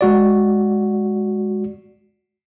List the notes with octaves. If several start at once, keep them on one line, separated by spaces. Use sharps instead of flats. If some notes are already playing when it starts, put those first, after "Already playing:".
G#3 F#4 D5